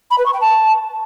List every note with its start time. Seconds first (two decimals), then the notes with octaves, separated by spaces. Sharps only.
0.10 B5
0.18 B4
0.25 C#6
0.33 G5
0.40 A5